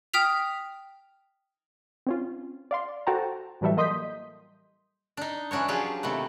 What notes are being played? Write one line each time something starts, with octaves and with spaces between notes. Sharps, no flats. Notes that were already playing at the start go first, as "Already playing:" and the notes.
G5 D#6 F6 B6 F7
C4 C#4 F4
D5 F5 C6
F#4 A4 C5 G5 A5 A#5
A2 E3 F#3 G3 A4 E5
A#3 D#5 C6 D#6 G6 B6
D4 D#4
E3 C#4 D4 F#4 C#5
F3 F#3 F4 G4 G#4
C3 D#3 A3 B3